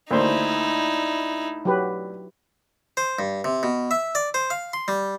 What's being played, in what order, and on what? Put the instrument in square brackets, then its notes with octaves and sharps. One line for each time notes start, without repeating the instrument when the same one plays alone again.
[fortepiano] D2 C5 [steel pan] A#3 [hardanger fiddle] D#4 E4
[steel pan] F#3 G4 B4
[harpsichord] C5
G2
C3
B2
E5
D5
C5
F5
C6
G3